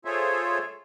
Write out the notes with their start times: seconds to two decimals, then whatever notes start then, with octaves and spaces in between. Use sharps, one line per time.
0.05 F4 G#4 A4 C5 C#5 E5